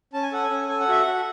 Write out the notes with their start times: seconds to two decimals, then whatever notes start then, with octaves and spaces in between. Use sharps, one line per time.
0.13 C#4 A5
0.23 G#5
0.32 A4 F#5
0.43 G#5
0.50 C#4
0.69 A4 G#5
0.80 F#5
0.88 F#4 E5
1.01 F#4 F#5